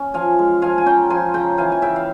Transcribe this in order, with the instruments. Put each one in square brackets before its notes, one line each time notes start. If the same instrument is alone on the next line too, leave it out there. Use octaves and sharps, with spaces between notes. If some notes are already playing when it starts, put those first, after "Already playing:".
Already playing: [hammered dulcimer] C#4
F3 F5 G#5
G#3
F3 F5 G#5
G#5
C#4 G5 A#5
F3 G#5 C6
C#3 G5 A#5
E3 F5 G#5
G#5
C#3 E5 G5
F5